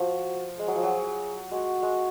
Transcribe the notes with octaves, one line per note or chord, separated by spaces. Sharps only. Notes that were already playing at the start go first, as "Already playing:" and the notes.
Already playing: F3 F#4
G#3 G#4
F#3
F3
F#3
G#3 F#4
G#3